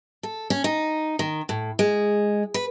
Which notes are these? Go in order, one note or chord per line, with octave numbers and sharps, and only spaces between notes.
A4
C#4
D#4
D#3
A2
G#3
B4